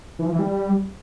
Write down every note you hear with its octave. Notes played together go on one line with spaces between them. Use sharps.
E3
F3
E3
G3